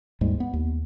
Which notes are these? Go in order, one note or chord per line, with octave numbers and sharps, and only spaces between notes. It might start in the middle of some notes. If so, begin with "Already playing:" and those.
D#2 G#2 G3 G#3
B3
D#2